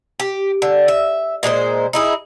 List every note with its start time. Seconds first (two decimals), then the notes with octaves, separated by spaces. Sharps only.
0.20 G4
0.62 D3
0.88 E5
1.43 A#2 G#3 F#4 C5
1.93 D#4 E4 G#4